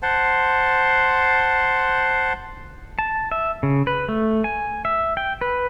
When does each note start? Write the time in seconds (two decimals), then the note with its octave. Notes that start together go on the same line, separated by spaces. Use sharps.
0.03 C5 F#5 A5 C6
2.99 A5
3.32 E5
3.63 C#3
3.87 B4
4.09 A3
4.44 G#5
4.85 E5
5.17 G5
5.41 B4